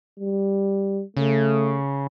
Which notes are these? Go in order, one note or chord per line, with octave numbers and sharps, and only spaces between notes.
G3
C#3 A3